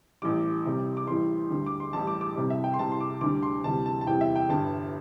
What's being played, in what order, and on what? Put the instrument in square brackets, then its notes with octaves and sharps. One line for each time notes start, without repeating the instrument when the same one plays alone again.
[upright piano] A1 A2 G3 D6
C2 C3 G3
D6
A1 A2 E3 G3 C6
D2 D3 G3
D6
C6
A1 A2 G3 A5
D6
D6
C2 C3 G3
E5
G5
C6
C2 C3 G3 A5
C6
D6
D2 D3 G3 D6
C6
D2 C3 E3 G3 A5
A5
A5
E2 C3 E3 G3 G5
E5
G5
G1 G2 G3 A5